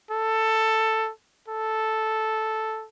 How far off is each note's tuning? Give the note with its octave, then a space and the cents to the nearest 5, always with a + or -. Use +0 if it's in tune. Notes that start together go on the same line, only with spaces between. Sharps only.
A4 +10
A4 -5